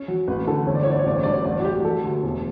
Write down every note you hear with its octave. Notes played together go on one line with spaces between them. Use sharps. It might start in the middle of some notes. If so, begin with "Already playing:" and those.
Already playing: C#4
F#3
A1 B4
D3 A4
G1 C#5
D5
C#5
D3 D5
C#5
A1 D5
C#5
G2 D5
C#5
A1 D5
F#4
A1 G4
F#3 A4
D2
E1